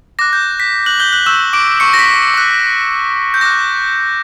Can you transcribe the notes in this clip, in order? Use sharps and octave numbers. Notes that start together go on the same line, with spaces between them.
D6 F#6 A#6
G6
B6
F#6 F#7
G6 G7
F#6 F#7
C#6 E6 G6 E7
D6 D7
C#6 C#7
A#6
B6
D6 F#6
G6
D6 F#6 A#6